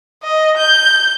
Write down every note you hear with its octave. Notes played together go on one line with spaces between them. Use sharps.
D#5
G6